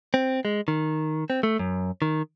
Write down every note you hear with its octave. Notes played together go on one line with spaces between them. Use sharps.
C4
G#3
D#3
C4
A3
F#2
D#3